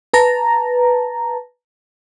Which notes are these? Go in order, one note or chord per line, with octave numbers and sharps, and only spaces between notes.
B4 A5 A#5